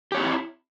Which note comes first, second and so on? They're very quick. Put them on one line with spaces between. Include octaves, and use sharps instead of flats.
G4 C#5 C4 D#4 E4